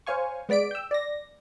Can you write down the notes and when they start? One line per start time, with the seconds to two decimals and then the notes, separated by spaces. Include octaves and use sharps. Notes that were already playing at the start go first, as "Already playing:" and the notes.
0.07 C5 C#5 F5 G#5 C#6
0.49 G#3 B3 D5 B6 D7
0.71 G5 E6
0.91 D5 A#6